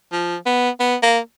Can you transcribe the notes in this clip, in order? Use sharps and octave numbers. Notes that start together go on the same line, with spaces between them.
F3
B3
B3
A#3